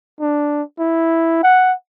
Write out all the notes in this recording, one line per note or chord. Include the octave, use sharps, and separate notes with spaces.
D4
E4
F#5